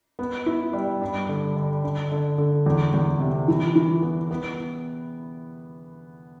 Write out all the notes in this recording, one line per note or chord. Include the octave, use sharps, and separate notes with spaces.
B3
E4
G3
G2
D3
D3
D3
D3
D3
E2
E2
C3
E3
E3
B3
B3